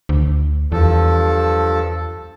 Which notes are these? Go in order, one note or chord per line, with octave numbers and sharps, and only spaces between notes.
D2
E2 G2 F3 A4